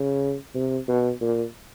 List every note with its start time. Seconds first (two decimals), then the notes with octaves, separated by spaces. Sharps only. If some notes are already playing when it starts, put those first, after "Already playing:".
Already playing: C#3
0.55 C3
0.88 B2
1.21 A#2